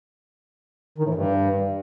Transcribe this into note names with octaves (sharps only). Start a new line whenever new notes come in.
D#3
A2
E3
G2